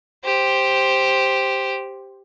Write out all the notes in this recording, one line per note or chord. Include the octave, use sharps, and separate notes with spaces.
G4 C5